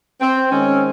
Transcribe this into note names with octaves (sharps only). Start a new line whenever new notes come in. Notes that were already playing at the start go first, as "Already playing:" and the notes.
C4
D#3 G#3 C4 C#4